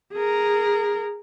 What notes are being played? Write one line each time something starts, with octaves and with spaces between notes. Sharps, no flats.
G#4 A#4